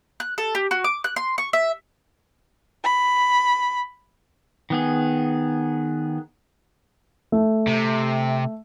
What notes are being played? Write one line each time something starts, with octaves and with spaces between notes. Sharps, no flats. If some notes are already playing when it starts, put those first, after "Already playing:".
F#6
A4
G4
F#4
D6
F#6
C6
C#6
E5
B5
D#3 B3 G#4
A3
C3